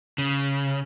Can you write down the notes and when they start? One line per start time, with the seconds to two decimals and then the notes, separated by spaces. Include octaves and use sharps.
0.18 C#3